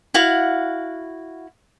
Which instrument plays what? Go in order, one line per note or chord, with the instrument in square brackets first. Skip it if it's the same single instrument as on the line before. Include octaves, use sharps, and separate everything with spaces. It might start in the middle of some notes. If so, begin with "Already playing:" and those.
[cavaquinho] E4 F#4 F5 F#5